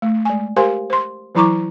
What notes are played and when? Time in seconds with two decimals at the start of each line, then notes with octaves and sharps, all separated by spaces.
0.02 A3
0.25 G#3 G#5
0.56 G4 A#4 C5 F5 G#5 C6
0.90 C5 C6
1.35 E3 F#3 E4 A#5 C#6 D6